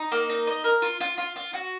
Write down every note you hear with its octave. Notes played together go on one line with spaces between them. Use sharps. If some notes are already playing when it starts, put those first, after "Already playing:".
Already playing: D#4
A#3
D#4
D#5
A#4
F4
F4
F4
F4
F#4